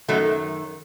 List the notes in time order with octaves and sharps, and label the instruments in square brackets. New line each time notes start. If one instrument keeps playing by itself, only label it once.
[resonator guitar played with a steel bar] F#2 D#3 F#3 A3